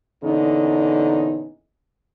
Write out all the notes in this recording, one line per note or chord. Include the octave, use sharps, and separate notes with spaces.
E2 A#2 D3 C#4 D#4